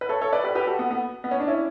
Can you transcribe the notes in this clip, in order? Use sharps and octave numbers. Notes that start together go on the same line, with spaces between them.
B4
A4 C#5
A4 C#5
B4 D5
G4 B4
G4 B4
F#4 A4
B3
B3
B3
C#4
D4
C#4 E4